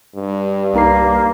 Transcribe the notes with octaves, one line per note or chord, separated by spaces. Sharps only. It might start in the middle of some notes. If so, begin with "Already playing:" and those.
G2
C2 A#3 D#4 C7